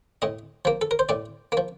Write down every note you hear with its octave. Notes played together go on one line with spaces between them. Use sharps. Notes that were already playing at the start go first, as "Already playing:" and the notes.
A2 D#5
F3 A#3
A4
A#4
C5
A2 D5
A#3
F3